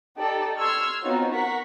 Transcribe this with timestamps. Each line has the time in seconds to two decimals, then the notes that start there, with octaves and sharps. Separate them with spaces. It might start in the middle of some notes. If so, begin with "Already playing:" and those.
0.18 D#4 G4 A4 D5
0.60 C6 C#6 E6 F6 G#6
1.02 B3 C4 D#4 F4 F#4 C#5
1.33 A#4 F#5 A#5 C#6 B6